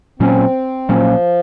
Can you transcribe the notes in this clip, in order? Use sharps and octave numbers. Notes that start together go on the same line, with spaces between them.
A#2 F#3 A#3 C4 C#4
A#2 F3 F#3 A#3 C#4